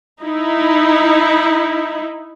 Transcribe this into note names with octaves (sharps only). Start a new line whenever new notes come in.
D#4 E4